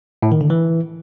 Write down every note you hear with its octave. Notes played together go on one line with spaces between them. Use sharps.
A2
D#3
D3
E3